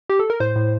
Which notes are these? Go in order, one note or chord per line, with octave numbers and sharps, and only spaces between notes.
G4
A4
A#4
A2 C5
A2